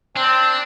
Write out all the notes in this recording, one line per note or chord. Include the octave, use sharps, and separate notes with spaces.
C4 D4